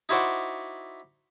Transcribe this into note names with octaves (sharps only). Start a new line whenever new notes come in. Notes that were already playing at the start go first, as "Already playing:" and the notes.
D#4 E4 F#4 C5 D5 F#5